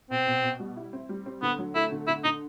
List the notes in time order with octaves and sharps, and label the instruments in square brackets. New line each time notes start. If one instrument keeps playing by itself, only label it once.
[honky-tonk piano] B2 [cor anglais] C4
[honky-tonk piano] B2
B2
G3
E4
C4
G3
C4
[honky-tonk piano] D3 [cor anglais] B3
[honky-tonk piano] F#3
[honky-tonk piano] A3 [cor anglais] E4
[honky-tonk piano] D3
[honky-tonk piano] D3 [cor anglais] E4
[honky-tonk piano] D3 [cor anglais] D#4